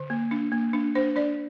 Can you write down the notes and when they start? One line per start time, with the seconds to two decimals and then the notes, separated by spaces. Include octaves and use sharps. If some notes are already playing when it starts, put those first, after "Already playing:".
Already playing: D3
0.10 A#3
0.31 D4
0.52 A#3
0.73 D4
0.95 D4 C5
1.16 D4 D5